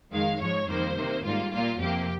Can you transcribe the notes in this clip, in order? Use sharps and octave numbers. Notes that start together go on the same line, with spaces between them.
F2 D#3 G#3 F5
G#2 F3 G#3 C#5
F2 D#3 G3 A#3 C5
C3 D#3 A#3
G#2 G3 A#3 F4
A#2 G3 A#3 F4
F2 C3 F3 A#3 G4